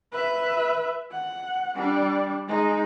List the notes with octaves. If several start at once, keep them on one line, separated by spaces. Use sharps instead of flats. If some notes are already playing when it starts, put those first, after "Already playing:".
B4 E5
F#5
G3 D4
G#3 D#4